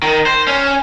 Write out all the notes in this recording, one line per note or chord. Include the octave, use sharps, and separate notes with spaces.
D#3
C5
C#4